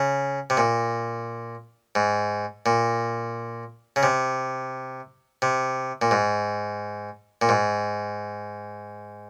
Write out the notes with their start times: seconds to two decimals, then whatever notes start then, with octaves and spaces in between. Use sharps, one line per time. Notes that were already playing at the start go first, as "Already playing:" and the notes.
Already playing: C#3
0.50 C3
0.57 A#2
1.95 G#2
2.66 A#2
3.96 C#3
4.03 C3
5.42 C3
6.02 A#2
6.11 G#2
7.42 A#2
7.49 G#2